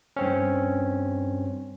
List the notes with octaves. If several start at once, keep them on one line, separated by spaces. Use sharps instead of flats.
G2 C4 C#4